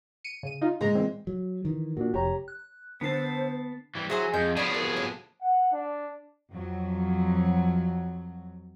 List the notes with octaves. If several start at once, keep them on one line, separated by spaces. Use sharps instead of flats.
C#7 D#7
C#3 D#7
D#4 F4
A2 C#3 G#3 A#5
A#2 E3 C4
F#3
D#3 E3
A#2 D4 F#4
F1 G4 C#5 A#5
F#6
D3 B3 D4 C5 A5 C7
E3 G3
F#3 E4 G#4 C5 G#5
F2 G#3 G6
B2 F3 D4 G#4 C#5 B5
C2 B3
A2 D4
F#5
D4
F2 F#3